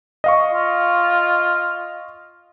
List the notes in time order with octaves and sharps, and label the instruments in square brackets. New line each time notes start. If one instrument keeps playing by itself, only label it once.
[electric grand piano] D#5 F5 C#6
[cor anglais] F4